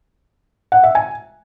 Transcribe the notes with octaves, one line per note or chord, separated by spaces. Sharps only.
F#5
E5
G#5